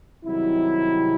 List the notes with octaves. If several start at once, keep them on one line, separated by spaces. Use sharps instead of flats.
C2 C3 D#3 F#3 E4